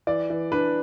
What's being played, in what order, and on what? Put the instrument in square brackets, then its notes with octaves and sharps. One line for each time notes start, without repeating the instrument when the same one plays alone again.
[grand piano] E3 D5
E3
D4 B4